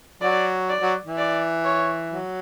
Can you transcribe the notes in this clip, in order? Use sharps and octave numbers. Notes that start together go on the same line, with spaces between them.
F#3 D5
D5
F#3
E3
D5
C#5
F#3